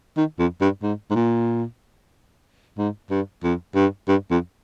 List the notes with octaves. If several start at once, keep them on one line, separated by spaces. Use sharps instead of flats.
D#3
F2
G2
G#2
G#2
A#2
G#2
G2
F2
G2
G2
F2